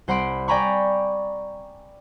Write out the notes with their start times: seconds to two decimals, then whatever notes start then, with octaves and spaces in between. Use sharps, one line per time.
0.08 C2 C5 F#5 B5 C6 D7
0.48 D5 G5 G#5 A#5 B5 C#6